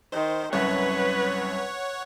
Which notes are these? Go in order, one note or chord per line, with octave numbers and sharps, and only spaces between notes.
D#3 C5
C2 F#2 B4 C#5 F#5